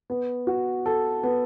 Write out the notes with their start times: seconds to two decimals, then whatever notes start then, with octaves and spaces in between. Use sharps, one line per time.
0.10 B3
0.47 F#4
0.86 A4
1.23 B3